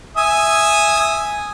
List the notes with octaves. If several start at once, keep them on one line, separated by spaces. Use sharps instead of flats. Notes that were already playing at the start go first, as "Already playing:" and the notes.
E5 G#5 D#6